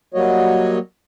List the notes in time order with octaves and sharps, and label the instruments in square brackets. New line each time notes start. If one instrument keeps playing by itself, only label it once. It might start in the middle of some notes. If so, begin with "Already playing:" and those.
[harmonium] F#3 G3 A#3 F#4 C#5 D#5